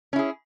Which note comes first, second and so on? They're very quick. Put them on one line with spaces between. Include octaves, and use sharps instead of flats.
C#4 E4 G#4